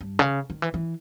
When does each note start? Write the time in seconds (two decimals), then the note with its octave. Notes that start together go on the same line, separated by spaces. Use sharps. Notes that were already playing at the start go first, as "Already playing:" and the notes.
0.01 G2
0.19 C#3
0.50 D#3
0.62 E3
0.74 E3